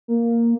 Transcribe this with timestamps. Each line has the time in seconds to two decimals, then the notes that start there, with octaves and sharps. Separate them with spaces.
0.08 A#3